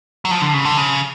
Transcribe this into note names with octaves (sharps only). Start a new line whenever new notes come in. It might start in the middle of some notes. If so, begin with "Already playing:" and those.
F#3
F3
D3
C#3
D3
C#3